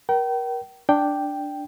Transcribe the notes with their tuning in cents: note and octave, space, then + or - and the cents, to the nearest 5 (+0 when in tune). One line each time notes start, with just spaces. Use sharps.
A#4 +30 G5 -35
D4 +0 G5 +0